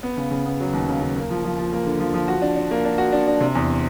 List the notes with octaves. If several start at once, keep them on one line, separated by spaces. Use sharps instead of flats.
B3
C#3
C#3
B3
F#3
D#2
C#3
C#3
A#3
F3
F3
F3
A#3
D3
F3
F3
F#4
D4
D4
A#3
D4
F#4
D4
D4
C3
E2